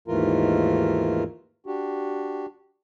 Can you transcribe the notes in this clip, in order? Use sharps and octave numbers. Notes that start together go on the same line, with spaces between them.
D#2 G#2 E3 A3 F4 A#4
D4 F#4 G4